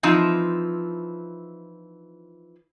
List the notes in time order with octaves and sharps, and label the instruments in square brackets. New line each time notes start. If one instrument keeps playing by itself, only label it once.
[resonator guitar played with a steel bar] E3 F3 C4 D#4 E4